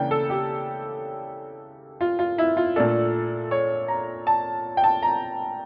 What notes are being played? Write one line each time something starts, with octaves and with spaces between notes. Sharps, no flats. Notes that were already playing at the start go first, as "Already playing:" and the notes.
Already playing: C#3 E3 A#3 D4 G5
A4
G4
F4
F4
E4
F4
A#2 A3 D4 A4
C#5
A#5
A5
G5
A5
A#5